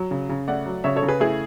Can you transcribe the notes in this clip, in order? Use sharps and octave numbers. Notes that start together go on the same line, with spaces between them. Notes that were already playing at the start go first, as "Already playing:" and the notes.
Already playing: F#3
C#3
C#3
A3 D5 F#5
F#3
C#3 C#5 E5
A4 C#5
C#3
G#4 B4
A3 E4 G#4